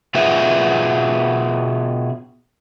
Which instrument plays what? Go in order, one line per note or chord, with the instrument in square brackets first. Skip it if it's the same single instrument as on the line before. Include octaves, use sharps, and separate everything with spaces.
[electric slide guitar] B2 B3 F4 G#4 B4 E5